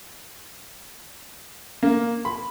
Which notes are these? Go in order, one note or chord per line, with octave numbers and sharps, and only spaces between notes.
A#3
B5